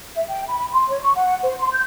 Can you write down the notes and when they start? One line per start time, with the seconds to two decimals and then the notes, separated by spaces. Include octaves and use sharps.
0.15 E5
0.28 G5
0.48 B5
0.72 C6
0.88 C#5
1.02 C#6
1.15 F#5
1.42 C5
1.59 C6
1.73 G6